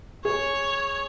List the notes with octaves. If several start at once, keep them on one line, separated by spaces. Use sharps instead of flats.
G#4 C#5